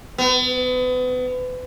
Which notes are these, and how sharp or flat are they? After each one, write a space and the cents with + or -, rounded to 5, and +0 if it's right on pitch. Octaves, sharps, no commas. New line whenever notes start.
B3 +35